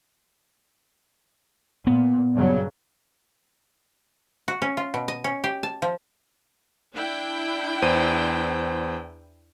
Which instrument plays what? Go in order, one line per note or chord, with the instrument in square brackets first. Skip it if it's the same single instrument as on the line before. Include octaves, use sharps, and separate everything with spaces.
[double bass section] A#2 [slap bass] B3
[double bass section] G2 C#3 F#3
[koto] F#4
C#4
F4
B2
D#5
C#4
G4
A5
F3
[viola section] D4 E4 G5
[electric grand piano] E2 C5 D#7